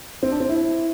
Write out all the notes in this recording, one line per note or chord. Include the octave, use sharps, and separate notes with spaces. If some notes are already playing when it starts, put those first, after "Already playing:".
C4
D4
C4
E4